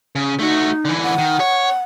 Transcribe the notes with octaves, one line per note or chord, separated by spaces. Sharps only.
C#3
A3 D#4 F#4
D3 E3
F#5
D#3
C#5